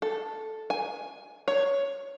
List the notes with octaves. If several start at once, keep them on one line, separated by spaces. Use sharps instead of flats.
A4
G#5
C#5